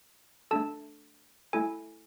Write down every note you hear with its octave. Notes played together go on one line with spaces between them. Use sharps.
A3 D4 A4 A5
A3 E4 A4 G#5